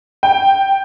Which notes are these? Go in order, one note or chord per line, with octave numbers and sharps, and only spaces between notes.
G5